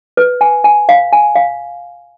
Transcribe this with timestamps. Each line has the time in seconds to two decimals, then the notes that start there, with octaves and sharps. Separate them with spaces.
0.17 B4
0.41 G#5
0.64 G#5
0.89 F5
1.13 G#5
1.35 F5